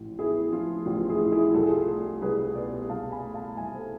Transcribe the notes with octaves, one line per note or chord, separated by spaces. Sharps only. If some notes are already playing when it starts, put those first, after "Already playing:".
Already playing: A1 A2 F3
B3 E4 G#4
F3 F4
A1 F4
E4 G#4
A2
E4 G#4
C2 A4
G#4
F4 A4
A3
C2 G#4 B4
B2 B4 D5
C2 F5 A5
G#5 B5
A3
F5 A5
C2 E5 G#5
A4 C5